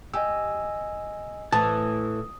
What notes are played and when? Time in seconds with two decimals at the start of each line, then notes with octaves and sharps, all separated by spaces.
0.14 G4 D#5 G#5 E6
1.52 A2 E3 A5 D#6